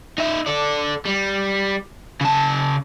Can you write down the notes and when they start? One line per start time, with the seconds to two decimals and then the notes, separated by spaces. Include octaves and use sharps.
0.18 D#4 E5
0.47 A4 D5
1.06 G3
2.21 C#3 A5